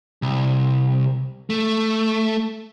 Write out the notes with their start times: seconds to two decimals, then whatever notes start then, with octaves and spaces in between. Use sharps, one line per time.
0.22 C2
1.50 A3